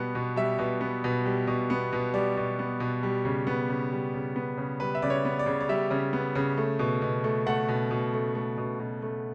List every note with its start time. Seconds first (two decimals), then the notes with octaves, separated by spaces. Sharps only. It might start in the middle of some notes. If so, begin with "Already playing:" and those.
Already playing: B2 G3 B3
0.15 B2
0.36 G3 E5
0.59 B2
0.81 B3
1.04 B2
1.26 G3
1.47 B2
1.70 B3
1.93 B2
2.14 G3 D5
2.37 B2
2.59 B3
2.80 B2
3.03 G3
3.25 C#3
3.47 B3
3.69 C#3
3.92 G3
4.14 C#3
4.36 B3
4.58 C#3
4.80 G3 B4
4.95 E5
5.02 C#3 D5
5.10 C#5
5.25 B3
5.39 D5
5.46 C#3
5.61 D5
5.69 G3 E5
5.91 C#3
6.13 B3
6.35 C#3
6.57 A3
6.79 B2
7.02 B2
7.24 A3
7.47 A3 F#5
7.69 B2
7.91 B2
8.13 A3
8.35 A3
8.58 B2
8.80 B2
9.02 A3